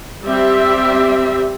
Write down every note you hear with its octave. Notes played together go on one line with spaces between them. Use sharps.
G3 C4 G4 E5